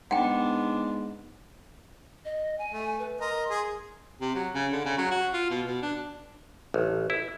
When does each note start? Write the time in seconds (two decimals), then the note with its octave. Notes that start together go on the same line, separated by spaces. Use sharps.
0.11 G#2 B3 D4 F#5 G5
2.25 D#5
2.58 G#5
2.70 A3
2.99 B4
3.20 A#4 D#5 C6
3.50 G#4 G#5
4.21 C3
4.35 F#3
4.54 C#3
4.72 D3
4.85 C#3
4.98 F#3
5.11 F#4
5.33 F4
5.50 B2
5.66 B2
5.82 D4
6.74 A1
7.10 E4